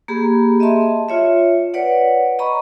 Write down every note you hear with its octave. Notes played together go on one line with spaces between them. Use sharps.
A#3 G4 G#4 B5
D#5 E5 A5 C6
F4 C#5 E5
B4 C#5 D5 F#5
D#5 A#5 B5 C#6